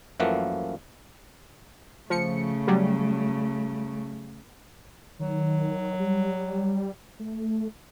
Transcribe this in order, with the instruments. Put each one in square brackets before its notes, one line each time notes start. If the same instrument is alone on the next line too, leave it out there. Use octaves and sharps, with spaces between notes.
[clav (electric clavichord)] F#2 E3 F3 A3 A#3 F#5
[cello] C#3 A3 [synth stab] F3 C#7
[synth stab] F#3 G3
[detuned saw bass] D#3 [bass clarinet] F#3
[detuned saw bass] G3
A3